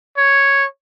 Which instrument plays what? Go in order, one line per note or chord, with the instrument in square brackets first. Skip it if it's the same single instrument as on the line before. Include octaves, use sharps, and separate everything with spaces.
[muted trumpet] C#5